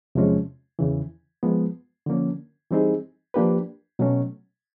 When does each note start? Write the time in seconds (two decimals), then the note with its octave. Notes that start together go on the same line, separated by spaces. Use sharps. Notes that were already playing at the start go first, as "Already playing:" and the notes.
0.15 E2 C3 F3 G#3 C#4
0.79 E2 C#3 E3
1.43 F3 G#3 B3
2.06 D3 F3 A#3 C#4
2.70 E3 G3 C4 D#4 G#4
3.34 F3 A#3 D4 G4 B4
3.99 B2 F#3 A3 C#4